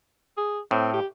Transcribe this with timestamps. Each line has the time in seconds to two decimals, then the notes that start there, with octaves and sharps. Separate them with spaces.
0.37 G#4
0.71 A2 C4
0.93 G4